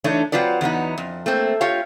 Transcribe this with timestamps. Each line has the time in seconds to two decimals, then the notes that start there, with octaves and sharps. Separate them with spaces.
0.04 E3 A3 D4 D#4 C#5
0.32 F#3 C4 F4 B4 D5
0.61 E2 F#3 B3 D#4
0.98 F2
1.26 A3 A#3 C4
1.61 F4 G4 C#5 F5